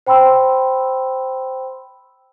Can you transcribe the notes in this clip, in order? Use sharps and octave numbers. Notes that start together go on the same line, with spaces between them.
C5 G5 B5 C6 E6